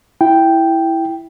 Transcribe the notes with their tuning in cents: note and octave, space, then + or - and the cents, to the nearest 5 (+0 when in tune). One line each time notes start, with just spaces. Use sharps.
E4 +0 G5 +0